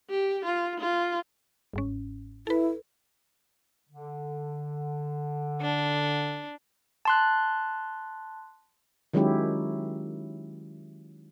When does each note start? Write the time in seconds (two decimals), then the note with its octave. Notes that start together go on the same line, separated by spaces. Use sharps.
0.10 G4
0.45 F4
0.80 F4
1.74 G1 G#2 C#4
2.47 E4 A4 B4
3.88 D3
5.61 D4
7.05 A5 C6 F#6
9.14 D#3 F#3 G#3 C#4 E4 G4